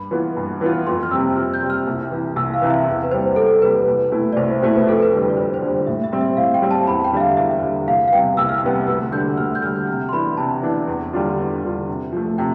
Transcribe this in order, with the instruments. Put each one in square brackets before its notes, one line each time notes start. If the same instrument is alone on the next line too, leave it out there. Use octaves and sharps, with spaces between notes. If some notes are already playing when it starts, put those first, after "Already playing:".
Already playing: [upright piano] G2 [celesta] B5
[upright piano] E3 B3 F4
G2
E3 B3 F4
[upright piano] F2 [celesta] C6
[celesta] F6
[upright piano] C3 G3 C4 [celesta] E6
[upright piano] F2 [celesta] F6
[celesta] G6
[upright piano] C3 G3 C4
[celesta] F6
[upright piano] C2
C3 E3
[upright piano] C2 [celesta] E6
[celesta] F5
[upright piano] C3 E3
[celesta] E5
[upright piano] E2
[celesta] B4
[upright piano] C3 G3 [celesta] C5
[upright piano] E2 [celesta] A4
[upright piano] C3 G3 [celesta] B4
[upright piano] C2
B2 A3 E4
[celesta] D5
[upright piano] C2 [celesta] C5
[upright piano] B2 A3 E4 [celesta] C5
[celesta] B4
[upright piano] F2 [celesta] A4
[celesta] B4
[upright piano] D3 G3
[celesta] D5
[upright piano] F2 [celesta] C5
[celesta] C5
[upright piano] D3 G3
[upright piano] A2 [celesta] E5
[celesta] E5
[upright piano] G3 C4
[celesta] E5
[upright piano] A2 [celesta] F5
[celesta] G5
[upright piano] G3 C4
[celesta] A5
[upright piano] E2 [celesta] B5
[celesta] G5
[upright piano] D3 G3 [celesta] E5
[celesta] F5
[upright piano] E2 [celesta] E5
[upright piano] D3 G3
[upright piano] C2 [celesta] F5
[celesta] F5
[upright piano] C3 G3 B3 [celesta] G5
[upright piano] C2 [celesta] E6
[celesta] F6
[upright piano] C3 G3 B3 [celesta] E6
[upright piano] D2 [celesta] E6
[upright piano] D3 G3 [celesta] G6
[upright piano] D2 [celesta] F6
[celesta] G6
[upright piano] D3 G3 [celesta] F6
[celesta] G6
[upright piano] C3 [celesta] F6
[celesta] C6
[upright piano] E3 B3 D4 [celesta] B5
[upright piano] C3 [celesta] A5
[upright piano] E3 B3 D4
E2
D3 G3 D4 F4
E2
D3 G3 D4 F4
C3
F3 A3
[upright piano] C3 [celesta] G5